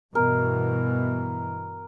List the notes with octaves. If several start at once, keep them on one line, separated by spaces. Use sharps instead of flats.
G2 B2 E3 A#4